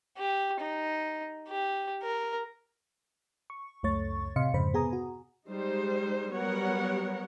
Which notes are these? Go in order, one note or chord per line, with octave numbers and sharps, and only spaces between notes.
G4
D#4
G4
A#4
C#6
C#2 F#2 A3 C#5 C#6 A6
A2 C3 D#5 F5 C6 C#7
F2 G#2 C#3 C5 B5
C3 B3 G#4 G#5 A#5 D#6
F#4
G3 G#3 D#4 C5
F#3 G3 B3 A#4 C#5 F#5